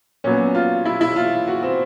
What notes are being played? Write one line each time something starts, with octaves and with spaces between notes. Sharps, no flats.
A#2 F#3 B3 C#4
F4
E4
E4
F4
F#4
C4